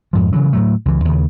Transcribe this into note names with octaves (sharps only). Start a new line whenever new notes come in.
F2 G#2 F3
C#3 E3 F#3
A2 F#3 A3
C#2 E3
D#2 C#3